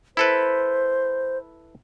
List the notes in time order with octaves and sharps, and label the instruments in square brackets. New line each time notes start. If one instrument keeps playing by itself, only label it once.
[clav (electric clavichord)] E4 A4 B4 [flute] C5